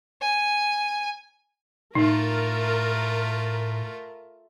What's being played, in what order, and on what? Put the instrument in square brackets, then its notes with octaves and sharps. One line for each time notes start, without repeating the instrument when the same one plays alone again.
[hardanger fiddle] G#5
[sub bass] A2 [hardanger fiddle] A3 F4 [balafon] D#4 [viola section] A#4